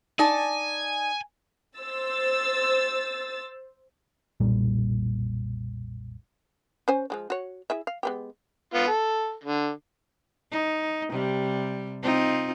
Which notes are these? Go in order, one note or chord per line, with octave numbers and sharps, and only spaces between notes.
D#4 D5 G#5 A5
C5 E6 A6
F1 B1 A#2 G3
C#4 C5 G#5
F3 G#3 D4
F#4 C#5
E4 G#4 E5
F5
G#3 B3 G4
B3 F4
A4
D3
D#4
C3 G3
C4 D#4 F4